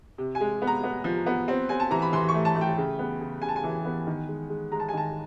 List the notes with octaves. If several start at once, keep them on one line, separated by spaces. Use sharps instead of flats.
C3
G#5
G#3
B3
A#5
B3
F3
B3
C4
C4 G#5
A5
E3 A#5
B5
E3 C6
C#6
A3
A5
A3
G5
C#3
B3
C#3
C#3 G#5
A5
G#5
E3
B3
D#3
G#3
G#3
G#3 A#5
A5
G#5
D#3 A5